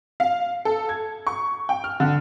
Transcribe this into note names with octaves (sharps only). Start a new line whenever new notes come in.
F5
A4
G#6
C#6
G5
F6
D3